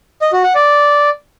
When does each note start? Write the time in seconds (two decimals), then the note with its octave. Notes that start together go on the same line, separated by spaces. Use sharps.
0.22 D#5
0.33 F#4
0.44 F#5
0.55 D5